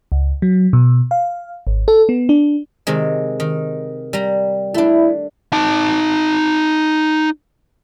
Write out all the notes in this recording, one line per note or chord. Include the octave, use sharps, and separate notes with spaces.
C#2
F#3
B2
F5
G#1
A4
B3
D4
C3 D#3 G#3
D#3
G3 A#5
A3 D4 E4
D#4 A5